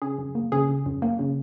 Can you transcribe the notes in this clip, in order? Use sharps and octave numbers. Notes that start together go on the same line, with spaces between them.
C#3 G#4
F#2
A#3
C#3 G#4
C#3
F#2
A#3
C#3